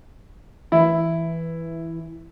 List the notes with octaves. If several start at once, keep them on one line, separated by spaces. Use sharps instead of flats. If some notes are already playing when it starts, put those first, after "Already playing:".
E3 E4